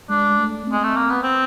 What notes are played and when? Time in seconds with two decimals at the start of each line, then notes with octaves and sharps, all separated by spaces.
0.09 G#3 D4
0.37 A3
0.67 C4
0.72 G#3
0.84 A3
0.97 A#3
1.10 B3
1.23 C4